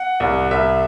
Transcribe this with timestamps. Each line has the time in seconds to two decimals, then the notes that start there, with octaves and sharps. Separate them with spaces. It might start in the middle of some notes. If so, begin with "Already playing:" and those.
Already playing: F#5
0.20 C2
0.51 C2 E5